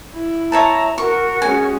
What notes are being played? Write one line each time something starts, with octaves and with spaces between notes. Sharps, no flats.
E4
C#5 E5 A5 A#5
F#4 A#4 C#6
G#3 C#4 G#5